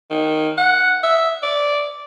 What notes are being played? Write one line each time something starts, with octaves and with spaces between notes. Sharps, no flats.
D#3
F#5
E5
D5